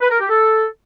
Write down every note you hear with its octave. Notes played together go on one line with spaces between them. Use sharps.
B4
A#4
G4
A4